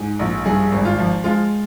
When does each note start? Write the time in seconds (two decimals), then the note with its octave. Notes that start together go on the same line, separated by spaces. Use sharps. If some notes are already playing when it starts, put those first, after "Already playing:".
Already playing: G#2 G#4
0.19 A#1
0.45 G2 G#4
0.72 G#1
0.85 F4
0.98 F3
1.24 G#3 F4